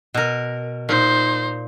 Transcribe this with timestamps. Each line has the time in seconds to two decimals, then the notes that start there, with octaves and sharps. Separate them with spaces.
0.14 B2 A#4
0.89 A#2 D#4 C5